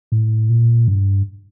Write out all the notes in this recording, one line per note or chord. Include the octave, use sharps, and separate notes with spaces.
A2
A#2
G2